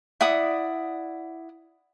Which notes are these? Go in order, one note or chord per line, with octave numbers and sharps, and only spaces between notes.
E4 D5 F#5 D#6